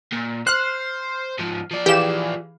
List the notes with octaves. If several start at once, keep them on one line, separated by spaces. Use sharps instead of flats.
A#2
C5 F6 F#6 C7
G#2 F3
F3 D5
E3 G4 G#4 F5 E7